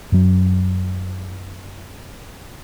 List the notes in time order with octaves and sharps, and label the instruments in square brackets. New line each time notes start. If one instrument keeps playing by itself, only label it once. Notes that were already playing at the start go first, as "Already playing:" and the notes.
[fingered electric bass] F#2 F#3